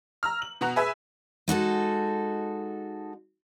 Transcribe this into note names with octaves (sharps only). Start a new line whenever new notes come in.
A#5 E6 F6
F#7
B2 F#4 A#5 F#6
G#4 B4 E5 G#5
G#3 D#4 F#4 A4